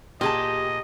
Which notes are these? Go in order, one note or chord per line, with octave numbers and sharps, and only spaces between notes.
A#2 G4 G#4 D#5 A5